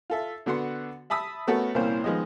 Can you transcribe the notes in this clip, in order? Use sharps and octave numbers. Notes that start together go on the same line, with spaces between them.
F4 A4 E5
D3 B3 F#4 F#5 C6
E5 A5 B5 D#6 E6
A3 B3 C#4 F#4 A4 A#4
C2 A#2 E3 A#3 C#4 C5
D#3 F3 G#3 B3 D#5